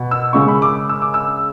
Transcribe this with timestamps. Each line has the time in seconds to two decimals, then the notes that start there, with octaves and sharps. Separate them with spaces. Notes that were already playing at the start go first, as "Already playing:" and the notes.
Already playing: B2
0.11 E6
0.33 C#3 G#3 C#6
0.48 B5
0.62 D6
0.89 E6
1.02 D6
1.14 E6